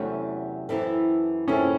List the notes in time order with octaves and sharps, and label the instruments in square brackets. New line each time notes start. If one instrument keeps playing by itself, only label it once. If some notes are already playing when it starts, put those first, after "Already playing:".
Already playing: [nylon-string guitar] E2 C3 F#3 A3 C#4
F#2 E3 C4 E4 A4
[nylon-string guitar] F#2 E3 C4 E4 A4 [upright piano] C#4